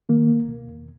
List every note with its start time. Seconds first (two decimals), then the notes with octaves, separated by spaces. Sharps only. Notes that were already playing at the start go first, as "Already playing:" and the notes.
0.09 D#3 A#3
0.29 C#2
0.48 B2
0.68 E2